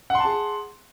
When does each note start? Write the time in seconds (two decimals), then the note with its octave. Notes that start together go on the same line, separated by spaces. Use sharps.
0.10 F#5
0.15 C6
0.20 A5
0.25 G#4